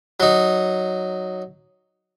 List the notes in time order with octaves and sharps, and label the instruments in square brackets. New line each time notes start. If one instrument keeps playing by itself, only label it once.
[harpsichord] F#3 D#4